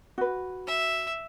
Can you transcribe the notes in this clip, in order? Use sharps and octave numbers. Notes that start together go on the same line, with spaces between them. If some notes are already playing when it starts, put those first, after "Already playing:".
F#4 B4
E5